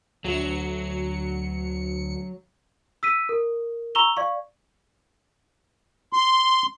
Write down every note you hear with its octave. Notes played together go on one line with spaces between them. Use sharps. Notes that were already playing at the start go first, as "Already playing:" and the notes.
D2 F#3 C#7
E6 B6 D#7
A#4
A#5 C#6 E6 F7 G7
D5 F5 C#6
C6